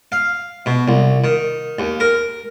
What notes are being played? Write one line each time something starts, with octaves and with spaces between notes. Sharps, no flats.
F5
B2
C2
D#3
D#2
A#4